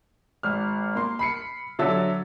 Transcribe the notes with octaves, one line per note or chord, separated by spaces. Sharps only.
G#1 F6
A#3 C6
B5 C7 C#7
D3 F#3 A4 E5 A6